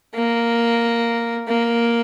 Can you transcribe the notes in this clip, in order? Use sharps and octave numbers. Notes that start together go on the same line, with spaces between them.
A#3
A#3